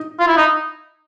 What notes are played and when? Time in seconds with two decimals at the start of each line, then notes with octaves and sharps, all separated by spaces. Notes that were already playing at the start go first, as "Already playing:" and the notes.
Already playing: D#4
0.20 F4
0.28 E4
0.37 D#4